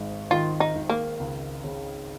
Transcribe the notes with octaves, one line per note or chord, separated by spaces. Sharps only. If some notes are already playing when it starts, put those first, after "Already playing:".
Already playing: G#1 G#2
D#3 F4
D#4
G#1
A#3
C#2
C#3